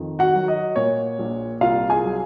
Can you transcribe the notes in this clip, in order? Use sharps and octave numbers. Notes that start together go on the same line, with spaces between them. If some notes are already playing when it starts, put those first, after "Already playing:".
Already playing: F2 D#3
F#4 F#5
F#3
D#5
A#2 C#5
A#1
C2 F4 F5
G#4 G#5
F#3